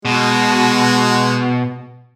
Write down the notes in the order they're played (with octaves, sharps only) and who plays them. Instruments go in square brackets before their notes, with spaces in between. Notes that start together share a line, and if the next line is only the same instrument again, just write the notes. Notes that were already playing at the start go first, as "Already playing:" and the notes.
[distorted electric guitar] B2 [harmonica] G#3 F#4